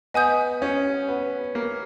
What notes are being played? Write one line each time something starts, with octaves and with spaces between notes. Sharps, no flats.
B3 D#5 G#5 D#6 G6
C#4
B3
A#3